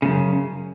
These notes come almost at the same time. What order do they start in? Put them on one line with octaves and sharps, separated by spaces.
C#3 A2 F#2